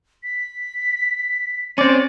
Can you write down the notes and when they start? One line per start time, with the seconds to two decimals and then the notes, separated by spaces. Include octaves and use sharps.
0.23 B6
1.78 C3 C4 C#4 D5